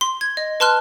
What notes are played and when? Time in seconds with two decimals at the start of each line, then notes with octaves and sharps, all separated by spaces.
0.01 C6
0.21 G#6
0.37 D#5
0.60 B4 A5 C6 F6 F#6